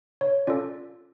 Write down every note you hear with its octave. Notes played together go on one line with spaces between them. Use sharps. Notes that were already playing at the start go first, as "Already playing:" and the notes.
C#5
C#4 F4 A4 D5